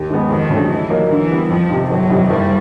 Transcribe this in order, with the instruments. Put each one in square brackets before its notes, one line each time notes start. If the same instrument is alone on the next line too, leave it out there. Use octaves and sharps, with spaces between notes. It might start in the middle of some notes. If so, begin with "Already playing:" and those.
Already playing: [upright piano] D#2
D#3 G#3 B3
[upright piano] F2 [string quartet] D#3
[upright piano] C#3 F#3 A3 D4
[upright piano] D#3 [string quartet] E3
[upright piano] F#3 A#3 D#4
[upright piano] D3 [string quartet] E3
[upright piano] G3 B3
[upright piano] F2 [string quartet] F3
[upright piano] C3 D#3
[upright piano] G1 [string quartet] F#3
[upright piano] F2 C3 D#3 G3
[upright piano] F#1 [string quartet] G3